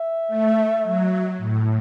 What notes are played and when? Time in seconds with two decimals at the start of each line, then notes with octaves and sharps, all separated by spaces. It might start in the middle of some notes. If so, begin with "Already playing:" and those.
Already playing: E5
0.28 A3
0.83 F#3
1.38 A2